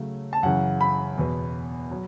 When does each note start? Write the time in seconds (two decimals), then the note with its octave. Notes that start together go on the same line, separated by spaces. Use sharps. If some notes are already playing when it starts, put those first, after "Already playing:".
Already playing: C#3 F#3 A3
0.33 A5
0.43 F#2 C#3 E3 F#5
0.81 B5
1.18 E2 B2 B3
1.91 F#3